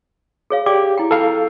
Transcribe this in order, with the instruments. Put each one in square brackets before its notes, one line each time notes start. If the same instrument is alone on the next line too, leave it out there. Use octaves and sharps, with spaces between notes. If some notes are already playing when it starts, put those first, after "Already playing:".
[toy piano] G#4 C#5 F5
[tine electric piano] G4 [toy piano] G#4 D5 D6
[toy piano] E4 G5
[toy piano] F4 [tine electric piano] A4 F5